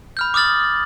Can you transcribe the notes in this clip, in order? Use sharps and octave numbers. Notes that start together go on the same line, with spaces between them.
B5 F6 G6
D6 D#6 F6 A6 F#7